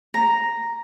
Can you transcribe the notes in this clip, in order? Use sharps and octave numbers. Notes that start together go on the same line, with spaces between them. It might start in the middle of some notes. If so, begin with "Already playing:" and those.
A#5